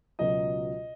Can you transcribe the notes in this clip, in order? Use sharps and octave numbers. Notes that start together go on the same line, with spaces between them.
C#2 B2 F#3 D#5